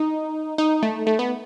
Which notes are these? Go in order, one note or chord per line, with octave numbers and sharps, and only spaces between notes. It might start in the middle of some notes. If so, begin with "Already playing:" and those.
Already playing: D#4
D#4
A3
A3
B3